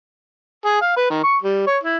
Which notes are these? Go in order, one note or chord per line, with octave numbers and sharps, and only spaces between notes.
G#4
F5
B4
D#3
C#6
G3
C#5
E4